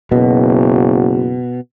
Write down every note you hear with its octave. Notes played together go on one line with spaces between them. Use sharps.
F#1 B2